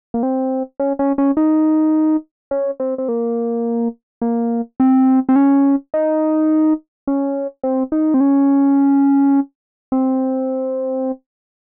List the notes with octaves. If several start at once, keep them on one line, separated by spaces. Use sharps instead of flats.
A#3
C4
C#4
C#4
C#4
D#4
C#4
C4
C4
A#3
A#3
C4
C4
C#4
D#4
C#4
C4
D#4
C4
C#4
C4